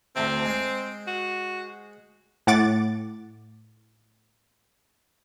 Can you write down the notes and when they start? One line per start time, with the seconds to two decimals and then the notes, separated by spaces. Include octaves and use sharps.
0.16 D2 A2 C3 C4
0.45 G#3 C5
1.07 F#4
2.47 A2 F#5 D6 A6